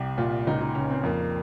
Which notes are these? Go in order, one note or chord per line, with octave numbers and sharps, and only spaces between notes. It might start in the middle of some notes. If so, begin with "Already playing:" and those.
Already playing: C2 G4
A#2 F4
C#2 D#4
D#4
C#3 C#4
C4
F2 A#3